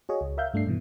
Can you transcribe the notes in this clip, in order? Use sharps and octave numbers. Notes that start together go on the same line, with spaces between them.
F#4 G#4 C#5 D#5
C#2
A#4 E5 F5 G6
G2 A3 D4 C7
G2 B2 E3